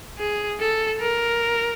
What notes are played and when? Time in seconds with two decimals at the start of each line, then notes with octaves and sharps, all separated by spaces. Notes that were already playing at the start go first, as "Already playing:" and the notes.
0.18 G#4
0.60 A4
1.00 A#4